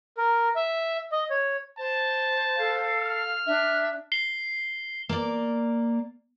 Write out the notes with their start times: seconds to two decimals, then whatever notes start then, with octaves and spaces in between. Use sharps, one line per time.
0.17 A#4
0.56 E5
1.12 D#5
1.30 C#5
1.78 C5 A5
2.57 A4 F5
3.00 F6
3.46 D4 E5
4.12 C7 G7
5.09 A#3 D5